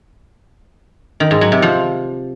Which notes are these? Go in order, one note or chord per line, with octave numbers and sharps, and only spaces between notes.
D#3
G#2
F#3
C3
F3